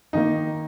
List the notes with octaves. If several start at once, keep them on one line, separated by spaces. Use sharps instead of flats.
D#3 A#3 D#4